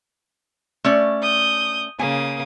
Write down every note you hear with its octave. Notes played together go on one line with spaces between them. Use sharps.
A3 C#4 D5
D#6 G6
C#3 A#3 G#5 D#6